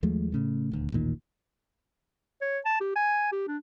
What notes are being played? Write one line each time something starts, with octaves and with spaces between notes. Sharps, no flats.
D#2 F3 G#3 A3
A2 C#3 A3
D#1 D2
A1 D#2 A#2 D#3
C#5
A5
G4
G#5
G4
D4